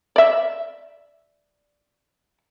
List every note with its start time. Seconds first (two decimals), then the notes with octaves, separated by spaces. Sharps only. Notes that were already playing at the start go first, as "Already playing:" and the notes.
0.16 D5 E5